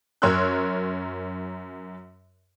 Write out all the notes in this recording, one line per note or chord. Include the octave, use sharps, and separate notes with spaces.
F#2 A#4 C#5 C6 E6 F#6